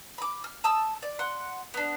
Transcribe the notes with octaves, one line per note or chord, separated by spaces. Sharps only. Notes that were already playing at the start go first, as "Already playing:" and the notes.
B5 D6
F6
A5 D#6 E6
D5
F#5 C6 F#6
B3 D4